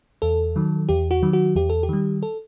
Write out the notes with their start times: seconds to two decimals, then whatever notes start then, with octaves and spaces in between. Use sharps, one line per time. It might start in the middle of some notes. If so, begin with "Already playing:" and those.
0.22 E2 A4
0.56 D#3 F#3
0.89 E2 G4
1.11 F#4
1.23 D#3 F#3
1.33 F#4
1.56 E2 G4
1.70 A4
1.83 G4
1.89 D#3 G3
2.23 A4